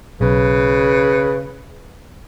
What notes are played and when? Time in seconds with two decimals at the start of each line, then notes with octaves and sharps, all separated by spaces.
0.21 B1 C#3 B4